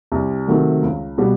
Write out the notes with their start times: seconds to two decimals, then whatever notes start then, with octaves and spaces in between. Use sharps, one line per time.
0.12 C2
0.47 C3 D#3 F#3 A3
0.83 C#2
1.18 B2 G3 B3